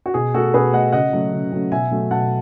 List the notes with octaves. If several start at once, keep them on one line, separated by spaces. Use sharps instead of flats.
F#4
B2 G#4
A3 F#4 A4
B2 G#4 B4
A3 D#5 F#5
C#3 D#5 F#5
F#3 A3
C#3
F#3 A3
B2 E5 G#5
F#3 A3
B2 F#5 A5